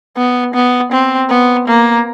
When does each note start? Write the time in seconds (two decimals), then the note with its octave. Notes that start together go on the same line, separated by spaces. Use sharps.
0.17 B3
0.54 B3
0.92 C4
1.30 B3
1.68 A#3